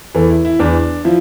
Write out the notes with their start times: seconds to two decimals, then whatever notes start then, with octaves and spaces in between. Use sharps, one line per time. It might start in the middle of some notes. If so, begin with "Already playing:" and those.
0.15 E2 E3 A4
0.30 E4
0.45 E4
0.59 E2 E3 D4
1.04 F3 E4